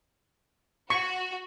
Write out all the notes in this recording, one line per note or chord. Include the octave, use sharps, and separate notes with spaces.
F#4 C#6